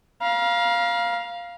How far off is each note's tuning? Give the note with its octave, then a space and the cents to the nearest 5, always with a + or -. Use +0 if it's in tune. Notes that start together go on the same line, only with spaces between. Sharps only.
F5 +0 A#5 +45